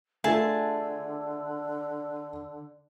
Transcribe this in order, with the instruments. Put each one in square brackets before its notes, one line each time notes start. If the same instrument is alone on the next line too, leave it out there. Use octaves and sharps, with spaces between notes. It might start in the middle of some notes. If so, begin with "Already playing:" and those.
[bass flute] D3 [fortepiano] A3 F4 A4 [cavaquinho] G#4 E5 A5